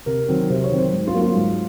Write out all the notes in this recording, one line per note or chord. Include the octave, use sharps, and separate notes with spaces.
C3 A#4
D#3 F#3 C4
C3 C5
C#5
D#3 F#3 C4
C5
G#2
F4
F#3 A#3 C#4
F4
G#2